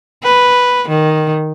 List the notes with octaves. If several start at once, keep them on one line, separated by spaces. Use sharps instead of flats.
B4
D#3